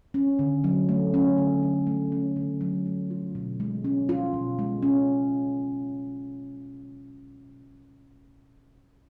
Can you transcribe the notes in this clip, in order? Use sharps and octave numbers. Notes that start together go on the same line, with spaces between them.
C#4
D3
F#3
A3
C#4
D3
F#3
A3
C#4
D3
F#3
A3
F4
B2
G#3
C#4
F4
B2
G#3
C#4